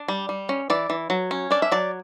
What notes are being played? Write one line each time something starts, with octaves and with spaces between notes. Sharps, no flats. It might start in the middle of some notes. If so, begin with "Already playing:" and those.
Already playing: D4
G3
G3
C#4
E3 D5
E3
F#3
C#4
D4 D5
E5
F#3 D5